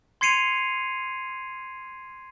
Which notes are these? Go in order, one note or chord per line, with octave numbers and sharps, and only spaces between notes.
C6 G#6 C7 C#7 D#7 F7